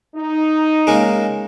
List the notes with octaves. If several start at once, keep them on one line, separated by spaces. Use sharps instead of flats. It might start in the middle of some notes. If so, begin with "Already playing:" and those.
D#4
C#3 G#3 A#3